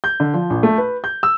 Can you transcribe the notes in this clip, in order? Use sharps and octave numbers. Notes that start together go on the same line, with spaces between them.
G6
D3
F3
A#1
A3
B4
G6
E6